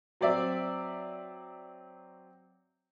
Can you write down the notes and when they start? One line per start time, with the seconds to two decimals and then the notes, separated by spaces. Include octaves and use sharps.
0.21 F#3 C4 D5 E5